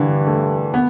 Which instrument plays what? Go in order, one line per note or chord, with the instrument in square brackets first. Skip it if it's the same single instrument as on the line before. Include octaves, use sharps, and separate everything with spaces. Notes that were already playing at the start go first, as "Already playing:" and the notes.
Already playing: [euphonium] G2 [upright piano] D3 E3
[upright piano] A3
B3